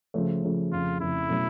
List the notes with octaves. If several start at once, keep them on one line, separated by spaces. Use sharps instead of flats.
C#3 F3 A3
C#3 F3 A3
F1 F2 C#3 F4
F1 F2 C#3 E4
B2 F#3 A3 C#4